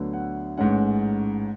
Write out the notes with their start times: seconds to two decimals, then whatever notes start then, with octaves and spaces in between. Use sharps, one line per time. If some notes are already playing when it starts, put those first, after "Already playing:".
Already playing: D2 D3 F#3 B3
0.13 F#5
0.58 A1 G#2 G#3 C#4 F#5